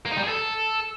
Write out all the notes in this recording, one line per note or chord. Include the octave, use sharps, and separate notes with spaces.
A#3
D#4
G3
G#4
A4